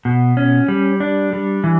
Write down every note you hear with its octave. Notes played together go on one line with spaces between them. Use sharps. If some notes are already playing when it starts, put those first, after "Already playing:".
B2
C#4
G3
D4
G3
E3